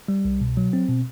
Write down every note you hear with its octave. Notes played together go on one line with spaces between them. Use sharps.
G3
C2
B2
F#3
C4
B2